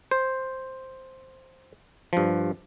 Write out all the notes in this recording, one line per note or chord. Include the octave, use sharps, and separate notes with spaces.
C5
G2 F3